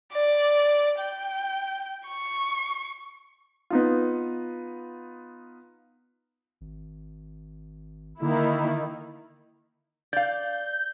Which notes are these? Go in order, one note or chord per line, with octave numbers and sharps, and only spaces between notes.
D5
G5
C#6
B3 D#4 F4
G#1
D3 D#3 A#3 E4
D5 F5 G6